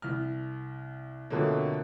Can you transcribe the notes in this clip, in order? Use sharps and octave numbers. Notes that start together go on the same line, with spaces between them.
C2 F6
F2 B2 D3 F#3 A3 A#3